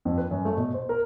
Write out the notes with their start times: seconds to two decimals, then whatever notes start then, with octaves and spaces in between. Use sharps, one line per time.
0.05 F2
0.18 B4
0.31 F#2
0.45 A3
0.57 B2
0.74 C5
0.89 A#4